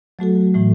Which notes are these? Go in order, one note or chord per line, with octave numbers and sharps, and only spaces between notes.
F#3 A3 F#4 A4
A2 E3 A3